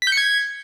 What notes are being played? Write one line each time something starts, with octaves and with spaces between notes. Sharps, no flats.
B6
G6
C#7
G#6